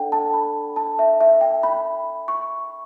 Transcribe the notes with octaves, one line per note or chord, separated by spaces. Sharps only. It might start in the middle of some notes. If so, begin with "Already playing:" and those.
Already playing: D4 A4 D5 F#5 G5
A5
B5
A5
E5
E5
G5
B5
C#6